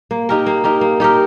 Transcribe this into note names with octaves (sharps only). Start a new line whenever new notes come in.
A#3
D#4 G4 A#4
A#3
D#4 G4 A#4
A#3
D#4 G4 A#4